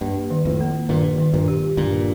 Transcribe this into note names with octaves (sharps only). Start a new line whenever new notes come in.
G2 A#3
D#3
F2 A2
A#3
G2 A#2 D#3
D#3
G2 A#2
G4
G2 A#2 D3